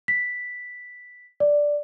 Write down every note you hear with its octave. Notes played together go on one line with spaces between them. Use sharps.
B6
D5